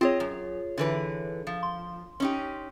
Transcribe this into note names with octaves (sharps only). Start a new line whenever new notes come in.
C4 F4 G#4 C#5 D#5
F#2
D3 E3 B4
F3
C6
C#4 D#4 G4